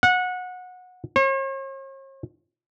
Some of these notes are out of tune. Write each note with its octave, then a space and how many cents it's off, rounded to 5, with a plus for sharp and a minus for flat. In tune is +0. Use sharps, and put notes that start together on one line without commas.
F#5 -20
C#5 -45